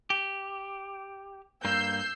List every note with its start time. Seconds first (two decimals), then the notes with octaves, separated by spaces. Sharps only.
0.10 G4
1.65 G2 A#3 E6 G6 C7